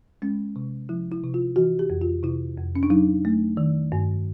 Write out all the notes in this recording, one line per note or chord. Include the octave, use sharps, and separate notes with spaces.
G#3 C#4
C3
F3 E4
E4
C3
F4
E3 F#4
G4
F2
F4
C3 E4
F2
C#4
D4
F#3 D#4
A3
D#3
G2